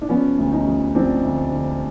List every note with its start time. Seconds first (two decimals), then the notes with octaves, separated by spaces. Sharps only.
0.02 D4
0.09 F3 B3 C#4
0.38 D2
0.52 C#4 D#4
0.67 F3
0.95 F3 C4 D4
1.23 D2
1.51 D3